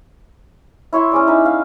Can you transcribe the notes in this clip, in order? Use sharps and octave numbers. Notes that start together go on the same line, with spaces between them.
E4 C#5 E5 C6
C#4 G#4 D5
D#4 B5
F5